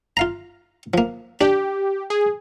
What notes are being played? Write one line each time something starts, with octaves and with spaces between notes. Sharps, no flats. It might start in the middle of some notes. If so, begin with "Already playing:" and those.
F4 F5 A#5
F3 A#3
D4 G4
G#4